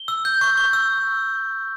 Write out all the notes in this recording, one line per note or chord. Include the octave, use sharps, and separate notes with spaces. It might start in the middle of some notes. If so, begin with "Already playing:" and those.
Already playing: G7
E6
G6
C#6
C#6
E6